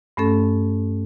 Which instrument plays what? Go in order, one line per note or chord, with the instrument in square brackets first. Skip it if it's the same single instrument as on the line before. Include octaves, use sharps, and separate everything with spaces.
[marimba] G2 A3 C#4 A4